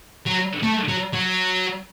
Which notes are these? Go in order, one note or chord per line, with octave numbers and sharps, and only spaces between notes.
F#3
A3
F#3
F#3